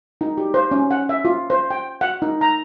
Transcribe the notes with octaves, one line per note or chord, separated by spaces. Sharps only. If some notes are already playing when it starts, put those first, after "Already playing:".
D#4
G4
C5
C#4
F#5
E5
F4
C5
G5
F#5
D#4
A#5